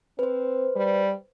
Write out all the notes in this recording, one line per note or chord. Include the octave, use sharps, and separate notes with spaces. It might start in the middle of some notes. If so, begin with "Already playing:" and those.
C4 B4 C5
G3